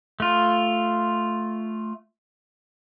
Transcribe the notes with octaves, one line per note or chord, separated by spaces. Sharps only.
A3 F4